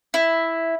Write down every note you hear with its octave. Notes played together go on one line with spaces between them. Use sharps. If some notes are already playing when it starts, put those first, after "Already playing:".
E4